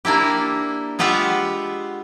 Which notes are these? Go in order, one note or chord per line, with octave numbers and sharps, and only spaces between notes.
A#3 D4 E4 G4
G#3 B3 F4 G4 E5 F#5